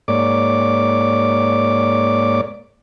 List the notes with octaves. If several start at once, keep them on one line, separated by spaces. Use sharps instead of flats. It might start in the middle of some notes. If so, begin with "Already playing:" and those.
G#2 A#3 C#5 D5 D6